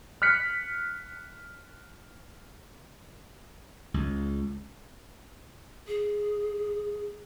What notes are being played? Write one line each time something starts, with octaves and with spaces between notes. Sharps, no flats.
F6 F#6 B6 C#7
C#2
G#4